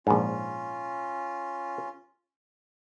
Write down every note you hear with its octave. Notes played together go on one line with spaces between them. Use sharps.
A#1 G#2 C#4 F4